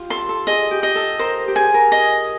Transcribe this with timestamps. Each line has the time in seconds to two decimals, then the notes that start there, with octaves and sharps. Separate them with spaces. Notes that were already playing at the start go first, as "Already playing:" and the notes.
Already playing: F4 G4
0.10 A4 C6
0.29 A4
0.47 G#4 D#5
0.71 G4
0.83 D#5
0.95 A4
1.19 A#4 C5
1.48 G4
1.56 G#4 G#5
1.74 A#4
1.92 D#5